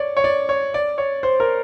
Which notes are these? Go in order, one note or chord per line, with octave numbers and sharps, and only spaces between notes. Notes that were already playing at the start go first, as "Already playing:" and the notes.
Already playing: C#5 D5
C#5
D5
C#5
D5
C#5
C5
A#4